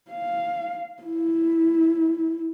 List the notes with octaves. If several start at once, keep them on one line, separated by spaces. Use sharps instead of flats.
F5
E4